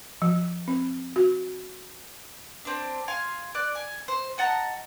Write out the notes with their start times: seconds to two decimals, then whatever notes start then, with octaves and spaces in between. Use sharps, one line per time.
0.22 F3
0.68 C4
1.16 F#4
2.65 C4 D4
3.08 F5 G#5 C6
3.55 D5 F#6
3.75 G#5
4.08 C5
4.38 D#5 F#5 A5 A#5